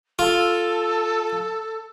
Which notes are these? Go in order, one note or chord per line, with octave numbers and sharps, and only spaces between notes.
F4 A4